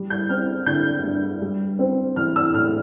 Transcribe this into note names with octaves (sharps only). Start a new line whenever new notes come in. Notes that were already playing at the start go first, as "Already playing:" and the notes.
Already playing: G3
G6
C4 F6
D3 G6
G2
G3
C4
E3 F6
E6
A2 F6